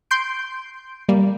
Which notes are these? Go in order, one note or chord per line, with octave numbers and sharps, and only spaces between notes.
C6 G6 D7
G3 A#3